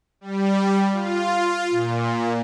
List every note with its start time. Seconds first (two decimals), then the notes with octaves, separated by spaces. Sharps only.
0.21 G3
0.92 F4
1.71 A#2